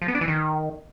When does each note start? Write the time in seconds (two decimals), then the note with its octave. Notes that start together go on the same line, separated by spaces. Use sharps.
0.02 F3
0.08 B3
0.15 D4
0.21 E3
0.28 D#3